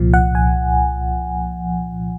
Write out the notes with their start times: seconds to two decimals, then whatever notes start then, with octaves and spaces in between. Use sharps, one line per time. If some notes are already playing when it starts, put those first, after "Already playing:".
Already playing: C2 A#2 F3
0.14 F#5
0.35 G#5